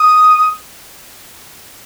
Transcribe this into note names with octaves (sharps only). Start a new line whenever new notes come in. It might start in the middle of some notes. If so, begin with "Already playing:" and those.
Already playing: D#6